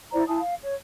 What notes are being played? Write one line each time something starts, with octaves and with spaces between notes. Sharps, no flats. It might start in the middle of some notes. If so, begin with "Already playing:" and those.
E4 C5 D5 A#5
E4 G#5 A5 D#6
F5
C#5